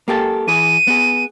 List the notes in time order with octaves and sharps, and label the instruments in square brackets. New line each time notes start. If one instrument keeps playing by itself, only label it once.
[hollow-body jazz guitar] A#3 G4 A4
[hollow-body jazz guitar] E3 G#4 [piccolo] D#7
[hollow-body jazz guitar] B3 G#4